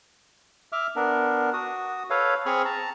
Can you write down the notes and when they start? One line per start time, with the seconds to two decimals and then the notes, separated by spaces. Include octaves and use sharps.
0.72 E5 D6 F6
0.96 B3 D4 A#4
1.53 F#4 D#6
2.10 A4 B4 C#5 F5
2.46 C4 G#4 B5 C#6 D#6 F6
2.65 A5 A#5